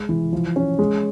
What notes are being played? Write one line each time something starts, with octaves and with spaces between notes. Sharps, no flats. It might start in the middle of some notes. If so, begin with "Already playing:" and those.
Already playing: G#3
E3
F3
C#4
G#3